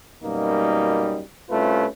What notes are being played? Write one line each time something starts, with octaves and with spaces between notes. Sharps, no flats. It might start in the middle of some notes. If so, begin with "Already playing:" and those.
F#2 B2 G3 A#3 D#4
C2 A3 C#4 F4 B4